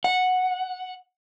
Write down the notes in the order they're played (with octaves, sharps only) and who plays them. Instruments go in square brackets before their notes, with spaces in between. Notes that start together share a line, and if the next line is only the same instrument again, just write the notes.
[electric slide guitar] F#5